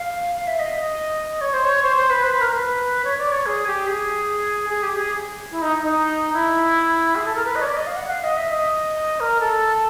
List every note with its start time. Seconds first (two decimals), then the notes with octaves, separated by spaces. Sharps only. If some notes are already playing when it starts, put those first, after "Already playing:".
Already playing: F5
0.35 F5
0.47 E5
0.59 D#5
1.41 C#5
1.53 C5
1.65 C#5
1.83 C5
1.96 C5
2.10 B4
2.23 C5
2.32 B4
2.41 A#4
2.51 B4
3.04 C#5
3.18 D5
3.32 C#5
3.46 G#4
3.67 G4
3.87 G#4
4.70 G#4
4.83 G4
4.96 G#4
5.52 E4
5.62 D#4
5.82 D#4
6.33 E4
7.15 G#4
7.25 A4
7.36 A#4
7.45 B4
7.56 D#5
7.62 C#5
7.66 D5
7.76 D#5
7.87 F5
7.96 F#5
8.10 F5
8.24 D#5
8.37 E5
8.50 D#5
9.20 A#4
9.40 A4